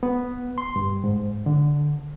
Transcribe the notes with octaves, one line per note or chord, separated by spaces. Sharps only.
B3
C6
G2
G#2
D3